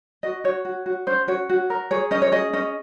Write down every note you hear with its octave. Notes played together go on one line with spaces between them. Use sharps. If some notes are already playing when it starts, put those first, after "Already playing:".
F#4 D#5
F#4 C#5
F#4
F#4
C#4 C5
F#4 C#5
F#4
A#4
G#4 C#5
C#4 D#5
C#5
G#4 D#5
C#4 D#5